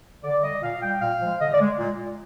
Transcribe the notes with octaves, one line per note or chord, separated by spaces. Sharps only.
D3 D5
G3 D#5
A#2 F5
G3 G5
A#2 F5
F3 G#3
D3 D#5
D5
G#3
A#2